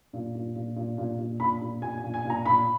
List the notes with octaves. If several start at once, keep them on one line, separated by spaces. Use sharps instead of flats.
A#2
A#2
A#2
A#2
A#2
A#2
A#2 B5
A#2
A#2 G#5
G#5
A#2
G#5
A#2
A#5
A#2 B5